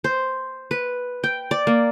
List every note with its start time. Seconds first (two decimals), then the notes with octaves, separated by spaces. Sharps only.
0.04 C5
0.71 B4
1.24 G5
1.51 D5
1.67 A#3